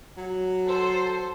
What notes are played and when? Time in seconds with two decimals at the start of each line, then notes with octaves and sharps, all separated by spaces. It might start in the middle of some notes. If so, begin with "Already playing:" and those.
0.18 F#3
0.64 A4 C5